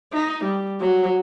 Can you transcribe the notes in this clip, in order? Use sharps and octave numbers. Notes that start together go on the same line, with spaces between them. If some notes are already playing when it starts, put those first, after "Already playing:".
D#4
G3
F#3